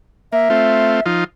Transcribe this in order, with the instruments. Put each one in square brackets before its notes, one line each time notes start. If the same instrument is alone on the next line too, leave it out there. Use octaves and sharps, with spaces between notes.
[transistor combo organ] A#3 [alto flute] E5
[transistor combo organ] A3 C4 F4
F3 D#4 F4